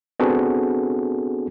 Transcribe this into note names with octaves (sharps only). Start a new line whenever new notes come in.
B3 C4 D4 F#4 G#4 A4